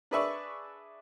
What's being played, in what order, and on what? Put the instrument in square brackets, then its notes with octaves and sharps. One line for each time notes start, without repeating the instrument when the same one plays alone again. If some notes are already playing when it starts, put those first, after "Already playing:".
[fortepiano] D4 G#4 B4 D5 E5 C#6